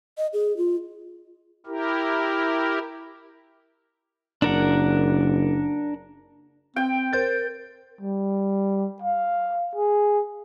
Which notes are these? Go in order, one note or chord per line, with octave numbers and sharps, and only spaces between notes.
D#5
G#4
F4
E4 G4 A#4
F#1 D4 A#4 F#5
C4 G5
A#4 C5 G6 A6
G3
F5
G#4